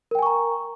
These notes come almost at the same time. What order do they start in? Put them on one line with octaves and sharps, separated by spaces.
A#4 G5 G#5 C#6 A#5